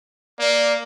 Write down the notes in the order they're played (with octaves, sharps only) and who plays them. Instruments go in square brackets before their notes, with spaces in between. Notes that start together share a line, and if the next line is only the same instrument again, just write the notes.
[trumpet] A#3 [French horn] D5